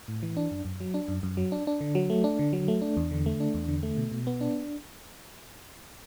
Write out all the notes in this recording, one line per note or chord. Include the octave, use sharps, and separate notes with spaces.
A2
E3
D4
F#2
F#2
F#3
D4
F#2
F#2
F#3
D4
D4
D3
F#3
A3
D4
D3
F#3
A3
D4
E2
D3
A3
D4
E2
D3
A3
B2
B2
B3
D4